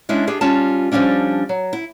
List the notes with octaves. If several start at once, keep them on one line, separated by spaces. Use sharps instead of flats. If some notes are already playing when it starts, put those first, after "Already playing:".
G#3 C#4 D4 E4
D4 G4 G#4
G3 C#4 F4 A5
F3 G3 A#3 C#4 D4
F#3
E4